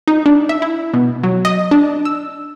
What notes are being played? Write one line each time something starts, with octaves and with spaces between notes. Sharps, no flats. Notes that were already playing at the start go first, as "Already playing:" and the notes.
D#4
D4
E5
E4
B2
F#3
D#5
D4
E6